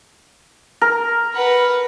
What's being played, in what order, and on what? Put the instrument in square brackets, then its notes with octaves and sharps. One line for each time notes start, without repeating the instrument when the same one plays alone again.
[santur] A#4
[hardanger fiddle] B4 F#5